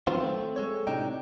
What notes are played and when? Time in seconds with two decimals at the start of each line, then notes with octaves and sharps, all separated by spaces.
0.07 D#3 F3 F#3 B3 C4 F4
0.20 A3 C4
0.56 G#3 A4 C#5
0.87 A2 C3 D4 D#4 G5